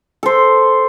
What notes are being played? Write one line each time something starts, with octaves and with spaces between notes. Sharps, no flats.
A4 C5